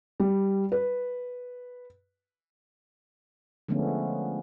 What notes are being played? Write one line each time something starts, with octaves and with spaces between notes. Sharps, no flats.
G3
B4
D3 F3 G#3 A3 B3 C#4